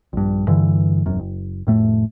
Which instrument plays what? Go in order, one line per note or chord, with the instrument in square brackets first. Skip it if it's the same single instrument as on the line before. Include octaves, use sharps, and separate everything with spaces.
[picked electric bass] A#1 G2
G2 D3 E3
E1 F#2
F#1
F1 A2 A3